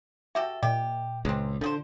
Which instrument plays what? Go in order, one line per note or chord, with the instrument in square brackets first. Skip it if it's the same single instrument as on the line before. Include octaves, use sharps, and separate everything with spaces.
[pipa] F#4 G4 A4 [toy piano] E5
[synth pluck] A#2 [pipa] G4 [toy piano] D#5
[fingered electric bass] C#2 [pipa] G#3 C4
[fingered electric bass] D3 [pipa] F3 G#4 C5